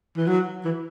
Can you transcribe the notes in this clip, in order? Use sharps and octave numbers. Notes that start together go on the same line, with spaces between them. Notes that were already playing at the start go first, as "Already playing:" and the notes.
E3
F#3
E3